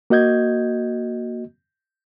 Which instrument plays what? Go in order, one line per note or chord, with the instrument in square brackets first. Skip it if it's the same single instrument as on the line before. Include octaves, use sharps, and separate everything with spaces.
[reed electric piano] A#3 F#4 D#5 G6 G#6